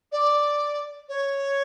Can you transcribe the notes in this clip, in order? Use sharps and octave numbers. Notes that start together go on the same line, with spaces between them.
D5
C#5